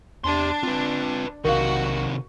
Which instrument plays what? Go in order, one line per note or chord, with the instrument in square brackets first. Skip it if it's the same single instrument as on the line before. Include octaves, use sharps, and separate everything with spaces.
[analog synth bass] E2 [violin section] D4 [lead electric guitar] G4 C6
[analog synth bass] C4 [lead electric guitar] F4 B4
[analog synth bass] B1 [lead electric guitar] C3 D#3 [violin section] F#4 [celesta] A#4 F5